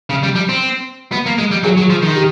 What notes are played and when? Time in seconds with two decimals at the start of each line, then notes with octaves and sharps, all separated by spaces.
0.10 C#3
0.23 G3
0.35 G3
0.49 C4
1.12 B3
1.26 A#3
1.38 G#3
1.51 G3
1.64 F#3 G#4
1.77 F#3
1.90 F3
2.02 D#3
2.15 G4